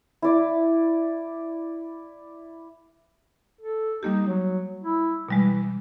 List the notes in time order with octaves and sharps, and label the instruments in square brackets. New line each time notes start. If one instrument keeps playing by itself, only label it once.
[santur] E4 D5 E5
[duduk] A4
[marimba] G3 A#3 G4 [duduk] D#4
[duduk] F#3
E4
[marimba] B2 G3 G#3 [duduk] E3